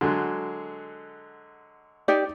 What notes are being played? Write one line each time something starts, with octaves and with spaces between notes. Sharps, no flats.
D3 F#3 G#3
D#4 G4 D5